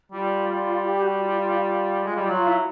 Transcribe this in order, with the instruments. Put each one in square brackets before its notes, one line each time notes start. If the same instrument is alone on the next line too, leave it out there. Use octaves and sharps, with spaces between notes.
[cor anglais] G3 [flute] F4
[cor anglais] G3
[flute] G4
F#4
F4
F4
F4
[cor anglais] G#3
G3
[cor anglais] F#3 [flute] F4
[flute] E4